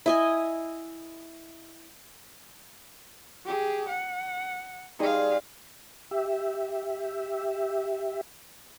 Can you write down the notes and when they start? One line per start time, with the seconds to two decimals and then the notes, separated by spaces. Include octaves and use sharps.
0.06 E4 D#5 G#5
3.45 G4 G#4
3.88 F#5
4.99 G3 D#4 G#4 C5 F5
6.11 G4 E5